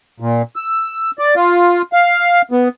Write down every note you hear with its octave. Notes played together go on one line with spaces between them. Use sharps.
A#2
E6
D5
F4
F5
B3